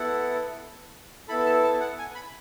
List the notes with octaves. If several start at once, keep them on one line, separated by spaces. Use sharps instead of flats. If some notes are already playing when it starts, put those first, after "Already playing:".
Already playing: B3 E4 A4 F#5
B3 E4 A4 B5
A5
A5
F#5
G#5
B5